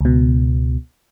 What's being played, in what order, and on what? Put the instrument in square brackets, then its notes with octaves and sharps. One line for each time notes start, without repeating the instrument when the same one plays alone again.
[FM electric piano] C#2 B2